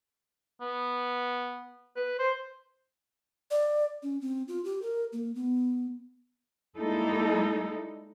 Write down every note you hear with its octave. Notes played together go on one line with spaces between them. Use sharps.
B3
B4
C5
D5
C#4
C4
F4
G4
A#4
A#3
B3
G3 G#3 A#3 D#4 E4 A4